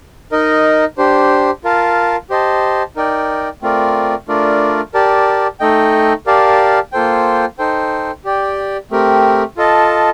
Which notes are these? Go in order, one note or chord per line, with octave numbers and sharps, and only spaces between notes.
D#4 A#4 D#5
D4 G4 C5
F4 A#4 F5 A5
G4 C5 D#5 A5
D#4 A#4 D5 G5
A3 C4 F4 A#4 D5
A3 D4 F4 A#4 D5
G4 A#4 D5 A5
A3 D#4 A4 D#5 G5
G4 A#4 D5 F5 A5
A#3 F4 A4 C5 G5
D#4 A4 C5 G5
G4 D5 G5
A3 C4 G4 A#4
F4 A4 D#5 A5